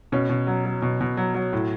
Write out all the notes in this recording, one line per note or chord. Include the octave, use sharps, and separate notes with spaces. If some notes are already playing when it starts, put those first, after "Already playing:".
B2 C#4
B2
F#3
F#3
B2
B2
F#3
F#3
A2